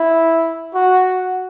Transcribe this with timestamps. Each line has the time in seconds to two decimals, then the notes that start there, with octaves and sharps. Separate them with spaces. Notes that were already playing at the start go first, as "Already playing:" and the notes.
Already playing: E4
0.74 F#4